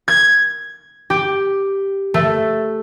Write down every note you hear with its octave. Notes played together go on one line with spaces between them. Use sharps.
G#6
G4
A3